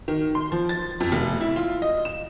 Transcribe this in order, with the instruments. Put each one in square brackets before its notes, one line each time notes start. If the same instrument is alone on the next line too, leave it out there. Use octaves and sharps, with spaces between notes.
[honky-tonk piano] D#3
C6
F3
A6
F2
F1
E4
F4
D#5
E7